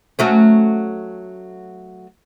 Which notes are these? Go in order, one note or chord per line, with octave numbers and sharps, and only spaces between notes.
F#3 A3 C#4